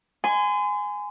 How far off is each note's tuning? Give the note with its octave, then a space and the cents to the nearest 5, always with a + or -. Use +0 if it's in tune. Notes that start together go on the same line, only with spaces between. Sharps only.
G#5 +0 C6 -40